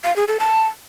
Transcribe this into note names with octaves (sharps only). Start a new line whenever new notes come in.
F5
G#4
A4
A5